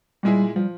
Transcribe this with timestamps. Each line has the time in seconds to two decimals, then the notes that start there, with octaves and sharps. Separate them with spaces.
0.23 A#2 G3 G#3 E4 G#4
0.55 F3 G3